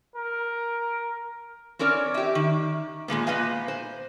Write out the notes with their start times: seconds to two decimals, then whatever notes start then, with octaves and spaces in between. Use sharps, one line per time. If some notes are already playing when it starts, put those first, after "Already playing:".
0.16 A#4
1.79 C4 C#4 A#4 C#5 D5
2.14 G4 E5
2.35 D#3
3.08 A#2 G#3 A#3 B3
3.27 A#2 B3 B4 D#5 F5 G#5
3.68 C5